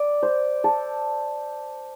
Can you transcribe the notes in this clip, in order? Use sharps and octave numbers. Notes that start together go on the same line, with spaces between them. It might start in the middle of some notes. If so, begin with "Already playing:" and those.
Already playing: D5
C5
A4